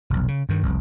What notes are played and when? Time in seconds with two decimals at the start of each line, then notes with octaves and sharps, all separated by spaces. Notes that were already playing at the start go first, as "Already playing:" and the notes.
0.10 F1 B1
0.28 C#3
0.49 G2 D#3
0.63 F1 C2